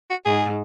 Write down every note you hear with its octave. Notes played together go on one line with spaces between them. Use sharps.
F#4
G#2 G#4